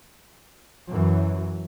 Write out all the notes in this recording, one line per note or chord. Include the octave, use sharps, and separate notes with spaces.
F#2 E3 F#3